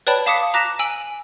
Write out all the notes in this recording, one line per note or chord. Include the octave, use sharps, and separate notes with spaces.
B4 C#5 D5 G5 A5 B5
F5 A5 D6 D#6 B6 C#7
A#5 D6 F#6 A#6 B6 E7
G#5 E6 D7 F#7